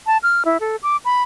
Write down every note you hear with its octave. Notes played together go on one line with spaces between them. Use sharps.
A5
F6
E4
A4
D6
B5